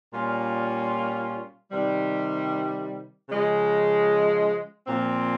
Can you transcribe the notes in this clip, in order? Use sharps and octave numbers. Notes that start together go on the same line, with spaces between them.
A#2 G3 C#4 F4
C3 D#3 G3
C#3 F3 G#3
A#2 F3 C4